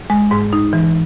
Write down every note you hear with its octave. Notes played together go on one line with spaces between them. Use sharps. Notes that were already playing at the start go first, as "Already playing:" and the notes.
G#3
G#2
D#4
E3